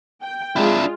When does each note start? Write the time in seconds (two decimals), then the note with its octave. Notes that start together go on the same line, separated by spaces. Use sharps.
0.21 G5
0.56 G#3 D4 E4 F4